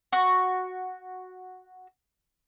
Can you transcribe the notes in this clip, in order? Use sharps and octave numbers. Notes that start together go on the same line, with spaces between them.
F#4 C#6